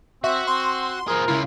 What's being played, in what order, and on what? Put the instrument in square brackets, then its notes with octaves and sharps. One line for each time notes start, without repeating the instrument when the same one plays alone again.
[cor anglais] C4 [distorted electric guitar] F#4 [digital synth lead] E5
[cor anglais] C4 [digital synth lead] C6
[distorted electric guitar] F3 G#4 [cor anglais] A#4
[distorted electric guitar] C#3 F4 [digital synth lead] E4